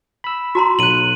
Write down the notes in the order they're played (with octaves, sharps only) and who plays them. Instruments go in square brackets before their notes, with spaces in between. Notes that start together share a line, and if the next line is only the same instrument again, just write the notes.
[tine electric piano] B5 E6
[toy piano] F#4 A#5 C6
[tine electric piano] B1 F#6 [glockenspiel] D#7 F#7